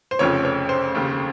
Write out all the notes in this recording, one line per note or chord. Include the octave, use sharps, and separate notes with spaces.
C5
F1 F2 C#3 F3 C#5
C#5
C5
F1 D#2 C#3